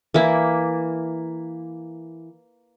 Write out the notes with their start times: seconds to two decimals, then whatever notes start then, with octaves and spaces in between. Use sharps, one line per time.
0.14 E3 A#3 E4